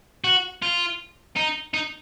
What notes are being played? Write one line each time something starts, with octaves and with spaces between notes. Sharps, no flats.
F#4
F4
D#4
D#4